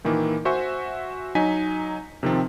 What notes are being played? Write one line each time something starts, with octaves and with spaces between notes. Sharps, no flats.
A#2 D#3 E3 A#3
F#4 C5 E5 G#5 C#6
F#3 D#4 G#5 B6
C3 D#3 F3 C4